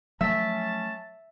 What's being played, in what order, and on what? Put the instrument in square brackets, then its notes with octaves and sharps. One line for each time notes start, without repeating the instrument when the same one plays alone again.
[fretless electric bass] F3 F#3 A3 [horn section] C#4 A5 [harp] E5